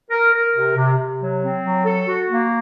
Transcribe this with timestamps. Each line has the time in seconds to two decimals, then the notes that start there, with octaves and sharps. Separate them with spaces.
0.10 A#4
0.33 A#4
0.55 C3
0.76 C3
0.97 C3
1.20 F#3
1.41 C4
1.63 F#3
1.85 A4
2.07 F#4
2.29 A#3